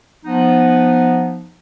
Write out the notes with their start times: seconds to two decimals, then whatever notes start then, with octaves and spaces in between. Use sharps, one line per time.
0.25 F3 B3 D#4